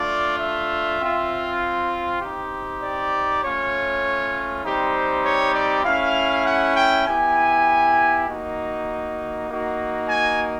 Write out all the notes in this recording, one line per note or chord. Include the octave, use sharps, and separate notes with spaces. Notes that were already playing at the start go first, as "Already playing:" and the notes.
Already playing: A3 D4 F4 D5
E5
C4 F4
C4 D#4 G4
D5
A3 C#4 F4 C#5
G3 C4 D#4 G4 C5
C#5
D5
A3 C#4 E4 F5
F#5
G5
B3 E4 G4 G#5
A#3 D#4 F#4
A#3 D#4 F#4
G#5